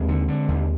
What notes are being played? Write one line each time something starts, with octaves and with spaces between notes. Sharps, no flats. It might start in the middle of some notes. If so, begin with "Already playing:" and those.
Already playing: D#2 G#3 C4
D3
D3
D#2